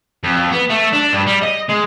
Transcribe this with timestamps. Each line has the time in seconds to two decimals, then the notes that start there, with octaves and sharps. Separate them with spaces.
0.23 F2
0.51 B3
0.69 A3
0.93 D4
1.12 G2
1.26 G3
1.42 D#5
1.69 G#3